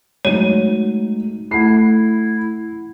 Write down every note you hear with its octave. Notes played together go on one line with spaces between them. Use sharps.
F#3 G#3 A3 D#4 C#5 D#7
A3 E4 F#5 B5 C7